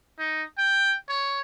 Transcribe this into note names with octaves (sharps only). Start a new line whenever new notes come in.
D#4
G5
C#5